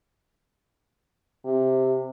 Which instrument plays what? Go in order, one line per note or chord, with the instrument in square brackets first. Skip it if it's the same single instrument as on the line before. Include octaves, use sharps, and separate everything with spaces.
[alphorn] C3